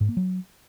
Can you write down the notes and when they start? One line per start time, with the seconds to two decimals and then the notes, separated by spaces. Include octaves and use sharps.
0.01 G#2
0.09 A#3
0.17 F#3